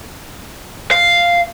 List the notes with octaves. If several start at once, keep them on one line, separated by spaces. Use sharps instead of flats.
F5